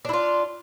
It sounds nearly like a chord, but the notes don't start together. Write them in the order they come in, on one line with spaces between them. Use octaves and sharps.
D4 E4 F4